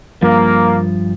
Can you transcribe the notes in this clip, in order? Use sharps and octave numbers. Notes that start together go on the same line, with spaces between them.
G2 F3 A#3